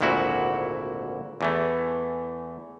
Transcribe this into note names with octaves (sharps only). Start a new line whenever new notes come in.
G#1 D2 A#2 E4 F#4
E2 E3 A3